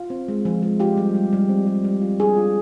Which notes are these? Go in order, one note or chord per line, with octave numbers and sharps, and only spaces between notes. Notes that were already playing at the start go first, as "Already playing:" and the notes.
Already playing: F4
C4
G#3
F3
G#3
F4 G4
G3
G3
G3
C4
G3
G3
F4
D4 G#4
F4